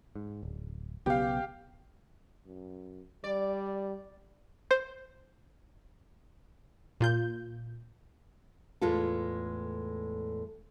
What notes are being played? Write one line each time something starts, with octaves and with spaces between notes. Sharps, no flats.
G#2
D1
B1 C#3 B3 G4 F5
F#2
G3 D5
C5
A#2 F4 G6
E2 A2 G#3 F4 A4